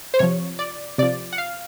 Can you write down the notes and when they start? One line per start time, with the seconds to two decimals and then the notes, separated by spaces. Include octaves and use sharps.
0.14 C5
0.19 C3 F3 C#5
0.59 D5
0.98 C3 F3 D5
1.33 F#5
1.38 F5